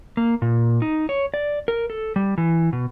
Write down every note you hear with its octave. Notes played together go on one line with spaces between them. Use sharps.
A#3
A#2
D#4
C#5
D5
A#4
A4
G3
E3
B2